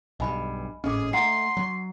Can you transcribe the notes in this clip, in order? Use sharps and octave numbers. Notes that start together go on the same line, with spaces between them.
B1 G2 D#5 G#5 B5
G#1 A2 C#4 G#4 D#5 D6
A3 D4 F#5 A#5 C6 C7
F#3